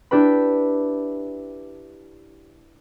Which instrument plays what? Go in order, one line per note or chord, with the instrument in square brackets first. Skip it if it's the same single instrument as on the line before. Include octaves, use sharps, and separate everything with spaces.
[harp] D4 E4 G4 B4 B5